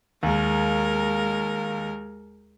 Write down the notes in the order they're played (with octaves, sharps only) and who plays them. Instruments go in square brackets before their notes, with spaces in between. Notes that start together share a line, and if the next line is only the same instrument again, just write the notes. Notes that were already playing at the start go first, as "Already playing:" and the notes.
[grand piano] D#2 [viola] G#3 A#4